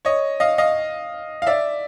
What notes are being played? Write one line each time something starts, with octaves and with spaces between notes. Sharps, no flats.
C#5 D#5
D#5 F5
D#5 F5
F5
D5 E5